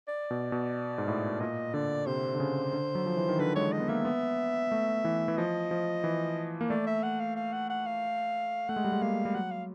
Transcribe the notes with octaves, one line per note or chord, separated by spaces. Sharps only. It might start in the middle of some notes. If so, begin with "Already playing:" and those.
D5
B2
B2
G#2
A2
A#2 D#5
D3 D5
C3 C5
D3
C#3
D3
F#3
F3
E3
D#3
D3 B4
G#3 C#5
D#5
B3
A#3 E5
B3
A3
E3
E3
F3 D#5
F3
E3
A#3
A3 D5
E5
F#5
F5
F5
F#5
F#5
F5
A3 F#5
G#3
G3
G#3
A#3 F5
G3
F#3 F#5
F5